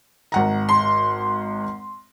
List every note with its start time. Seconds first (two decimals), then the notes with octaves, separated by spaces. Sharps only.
0.32 G#1 F#5 A#5
0.69 C6